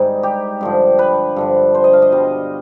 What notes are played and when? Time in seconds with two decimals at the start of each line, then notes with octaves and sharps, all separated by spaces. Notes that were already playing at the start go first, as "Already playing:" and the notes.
Already playing: G#2 C3 D#3 G3 D#4
0.23 G4
0.61 G2 D3 F3
0.99 B4
1.36 G2 D3 F3
1.74 C5
1.84 D#5
1.93 F5
2.02 D#5
2.12 B2 G3